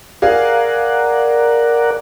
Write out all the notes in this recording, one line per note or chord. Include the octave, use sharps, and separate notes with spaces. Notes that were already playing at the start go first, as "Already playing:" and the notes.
G#4 A#4 D5 F5 F#5